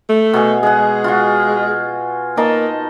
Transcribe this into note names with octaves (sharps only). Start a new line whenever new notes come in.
A3
B2 G#4
G#3 G#4 F#5
F4 F#4
A#3 D#4 D#5 A5